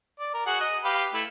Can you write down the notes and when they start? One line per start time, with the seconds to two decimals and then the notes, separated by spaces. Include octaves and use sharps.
0.20 D5
0.34 A#4
0.46 F#4 G#4 F#5
0.61 D#5
0.84 G4 B4 F5
1.14 A3 E4